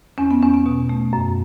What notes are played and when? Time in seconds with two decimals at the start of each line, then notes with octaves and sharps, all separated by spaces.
0.18 E2 C#4
0.31 B3
0.42 E2 C#4
0.54 B3
0.66 B2
0.89 A3
1.13 F#2